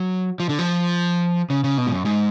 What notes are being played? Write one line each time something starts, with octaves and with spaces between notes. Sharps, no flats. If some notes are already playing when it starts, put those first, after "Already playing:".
Already playing: F#3
F3
D3
F3
C#3
C#3
B2
G#2
F#2
G#2